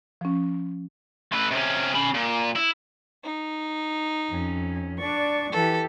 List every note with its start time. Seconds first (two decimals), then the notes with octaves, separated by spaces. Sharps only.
0.21 F3 C#4
1.32 A3 B4
1.51 C3 C#4
1.94 C#4 B5
2.14 A#2
2.56 E4
3.24 D#4
4.29 F2 C#4
4.98 D4 D5 C#6
5.52 E3 G4 A4